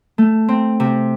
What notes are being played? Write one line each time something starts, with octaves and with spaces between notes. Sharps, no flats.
A3
C4
C3